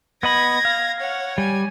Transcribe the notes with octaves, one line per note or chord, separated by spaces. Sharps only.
B3 D#5 B5 G#6 A#6
F5
C#5 F#5
G3 G#5